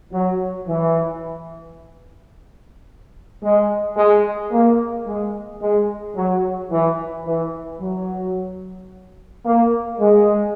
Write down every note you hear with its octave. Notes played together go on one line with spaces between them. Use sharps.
F#3
E3
G#3
G#3
A#3
G#3
G#3
F#3
E3
E3
F#3
A#3
G#3